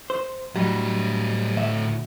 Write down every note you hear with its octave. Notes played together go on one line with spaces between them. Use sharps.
C5
A2 F#3 G3 D#5
D2 E5